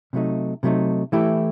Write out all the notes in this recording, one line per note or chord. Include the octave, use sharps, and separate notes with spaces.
C3 F#3 A3 D#4
C3 F#3 A3 D#4
E3 A3 E4 G4